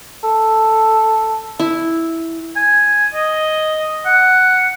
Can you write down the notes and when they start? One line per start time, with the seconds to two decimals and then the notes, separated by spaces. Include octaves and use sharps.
0.24 A4
1.59 E4
2.56 G#5
3.14 D#5
4.06 F#5